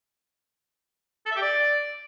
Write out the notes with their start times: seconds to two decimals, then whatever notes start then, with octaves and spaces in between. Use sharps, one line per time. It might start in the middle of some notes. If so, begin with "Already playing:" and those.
1.26 A4
1.31 E5
1.36 G4
1.42 D5